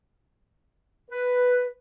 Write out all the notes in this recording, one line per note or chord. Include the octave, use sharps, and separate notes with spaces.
B4